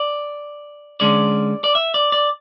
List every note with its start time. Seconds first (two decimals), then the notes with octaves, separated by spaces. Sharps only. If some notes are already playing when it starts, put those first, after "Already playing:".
Already playing: D5
1.00 D3 G#3 C#4 D5
1.64 D5
1.75 E5
1.94 D5
2.12 D5